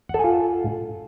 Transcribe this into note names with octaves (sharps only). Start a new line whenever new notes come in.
F4 A4 F#5 G#5